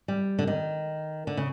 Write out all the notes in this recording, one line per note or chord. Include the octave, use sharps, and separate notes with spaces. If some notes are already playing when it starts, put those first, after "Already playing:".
G3
D3
D#3
D3
C#3